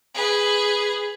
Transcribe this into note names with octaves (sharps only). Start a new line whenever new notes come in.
G#4 B4